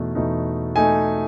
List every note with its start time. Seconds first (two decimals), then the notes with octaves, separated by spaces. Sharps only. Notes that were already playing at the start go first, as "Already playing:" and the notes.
Already playing: E2 B2 A3 D#4
0.15 E2 B2 A3 D#4
0.76 A3 D#4 G#5